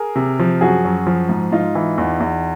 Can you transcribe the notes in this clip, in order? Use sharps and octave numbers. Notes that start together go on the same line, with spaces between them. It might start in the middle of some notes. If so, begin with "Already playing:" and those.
Already playing: G#4 A#4
C3
F3
F#2 F#4 G#4
F#2
F3
G#2
G#2 D#4 F4
E3
E2
E2